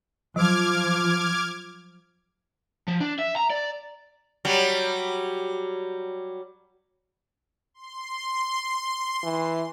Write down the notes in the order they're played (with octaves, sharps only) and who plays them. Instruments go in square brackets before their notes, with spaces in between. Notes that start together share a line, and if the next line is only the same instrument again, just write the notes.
[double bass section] F3 [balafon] F#3 [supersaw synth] D6 F6 G#6
[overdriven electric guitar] F3
D4
E5
A#5
D5
[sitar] F#3 G3
[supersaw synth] C6
[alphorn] E3